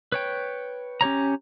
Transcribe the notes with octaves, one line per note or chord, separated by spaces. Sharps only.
B4 C#5 G5
C#4 G4 C#5 A#5